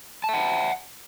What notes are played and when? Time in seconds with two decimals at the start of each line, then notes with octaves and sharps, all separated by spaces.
0.24 A5
0.29 E5
0.33 F#5